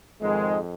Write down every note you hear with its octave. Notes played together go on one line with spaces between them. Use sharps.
F2 G#2 D#3 G#3